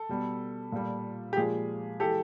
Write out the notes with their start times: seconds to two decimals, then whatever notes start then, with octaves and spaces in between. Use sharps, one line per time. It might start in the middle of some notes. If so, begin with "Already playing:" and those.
Already playing: A4
0.09 B2 G3
0.72 A#2 G3
1.33 G4
1.37 A#2 F3 G#3 G#4
2.00 E3 G#3 G4 A4